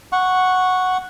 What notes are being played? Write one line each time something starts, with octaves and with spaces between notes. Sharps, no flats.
F#5 C#6